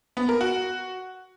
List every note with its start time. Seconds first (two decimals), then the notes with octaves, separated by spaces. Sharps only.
0.17 B3
0.29 A#4
0.41 F#4